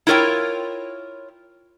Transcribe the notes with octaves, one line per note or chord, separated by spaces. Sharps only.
E4 F4 A#4 C#5 G5